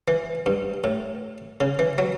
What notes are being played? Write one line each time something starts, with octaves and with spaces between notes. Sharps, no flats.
E3
G2
A2
C#3
E3
F#3